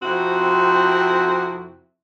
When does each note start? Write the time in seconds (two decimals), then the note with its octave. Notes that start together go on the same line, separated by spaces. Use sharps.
0.02 F2 C3 C4 E4 F#4